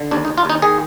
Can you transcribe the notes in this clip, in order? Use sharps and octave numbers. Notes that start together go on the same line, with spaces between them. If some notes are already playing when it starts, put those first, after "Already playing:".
Already playing: D3
D#2 D4
D#4
D#2
F4
D#2 D#4
D#3 G#4